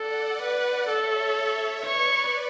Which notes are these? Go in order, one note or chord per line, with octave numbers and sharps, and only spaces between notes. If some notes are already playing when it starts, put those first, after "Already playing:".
Already playing: A4 D5 F#5
B4
A4 C#5 E5
B4 C#5 D5